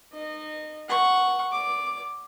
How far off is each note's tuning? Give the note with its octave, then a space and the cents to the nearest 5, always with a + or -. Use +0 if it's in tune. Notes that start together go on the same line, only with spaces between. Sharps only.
D#4 -25 D#5 -25
F#5 +0 C#6 +0
D5 -30 D6 +5